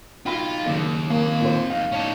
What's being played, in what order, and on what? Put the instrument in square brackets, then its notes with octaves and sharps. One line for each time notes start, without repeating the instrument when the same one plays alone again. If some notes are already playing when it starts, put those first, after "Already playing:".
[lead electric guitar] D#4 F#4 [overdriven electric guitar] F4 [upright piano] G5 B5
[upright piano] F#1 [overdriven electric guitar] D#2
[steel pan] A#3 [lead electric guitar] C4 F5
[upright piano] A#2 C5
[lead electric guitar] F2 D#4 [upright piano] F5
[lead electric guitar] A2 A5 [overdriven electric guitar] C#4 D#4